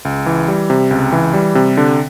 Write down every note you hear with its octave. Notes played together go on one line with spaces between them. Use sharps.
C#2
E3
G3
C3
C#2
E3
G3
C3
D3